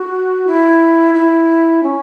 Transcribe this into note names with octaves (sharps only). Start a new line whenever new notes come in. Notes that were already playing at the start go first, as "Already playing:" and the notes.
Already playing: F#4
E4
E4
C#4